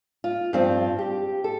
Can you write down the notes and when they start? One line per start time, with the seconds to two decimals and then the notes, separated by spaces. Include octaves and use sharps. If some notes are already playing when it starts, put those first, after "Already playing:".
0.24 F4
0.53 G2 F3 C4 F4
0.99 G4
1.44 A4